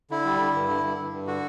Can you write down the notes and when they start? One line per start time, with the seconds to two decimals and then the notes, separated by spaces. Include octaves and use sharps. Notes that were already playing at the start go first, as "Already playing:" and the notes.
0.11 D3 E4
0.25 G3
0.40 D3
0.55 G2
0.68 D3
0.83 G2
0.98 G2
1.13 G2
1.27 D3 F#4